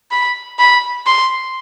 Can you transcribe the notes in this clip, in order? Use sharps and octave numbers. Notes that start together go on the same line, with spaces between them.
B5
B5
C6